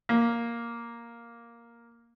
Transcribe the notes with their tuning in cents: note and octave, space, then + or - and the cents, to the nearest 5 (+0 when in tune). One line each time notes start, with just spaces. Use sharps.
A#3 +5